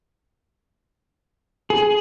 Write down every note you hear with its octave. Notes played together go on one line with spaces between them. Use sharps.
G#4